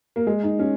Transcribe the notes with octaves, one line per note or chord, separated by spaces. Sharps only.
A#3
G#3
D#4
C#4